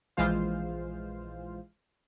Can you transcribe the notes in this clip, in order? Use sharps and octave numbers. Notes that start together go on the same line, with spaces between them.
A#1 E3 G#3 F4 C5 F5